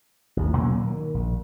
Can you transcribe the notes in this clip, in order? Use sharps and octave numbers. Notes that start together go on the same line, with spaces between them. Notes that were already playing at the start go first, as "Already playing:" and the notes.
A1 D#2
A#2 F#3 A#3 C#4
D#3
A#1